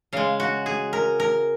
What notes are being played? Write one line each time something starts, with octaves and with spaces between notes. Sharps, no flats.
C#3 G#3 F5
F#4
G#4
A#4
A#4